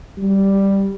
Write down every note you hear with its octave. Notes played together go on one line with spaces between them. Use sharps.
G3